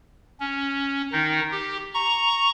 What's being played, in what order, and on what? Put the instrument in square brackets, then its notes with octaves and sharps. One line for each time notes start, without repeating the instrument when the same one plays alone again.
[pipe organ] C#4
D#3 D#4
G4
A#5 C#6